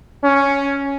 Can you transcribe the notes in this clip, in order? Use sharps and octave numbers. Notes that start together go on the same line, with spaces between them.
C#4